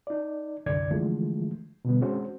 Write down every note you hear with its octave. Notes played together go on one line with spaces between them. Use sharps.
D#4 D5
C2 F#2 D3 D5 G#6
D3 E3 F3 G#3 A3
B2 D3 G3 B3
G#3 C4 C#4 F#4 C5